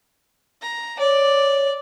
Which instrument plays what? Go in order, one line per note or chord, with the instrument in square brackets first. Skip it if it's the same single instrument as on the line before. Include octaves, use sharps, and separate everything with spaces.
[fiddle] A#5
[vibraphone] C#5 [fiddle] D5